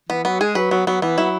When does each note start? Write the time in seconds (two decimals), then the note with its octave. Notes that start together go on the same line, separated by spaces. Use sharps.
0.09 E3 B3
0.25 F#3 B3
0.41 G#3 G#4
0.55 F#3 B4
0.71 F#3 B3
0.87 F#3 B3
1.02 E3 B3
1.18 F#3 E4